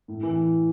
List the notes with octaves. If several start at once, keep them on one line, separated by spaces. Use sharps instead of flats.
A2
E3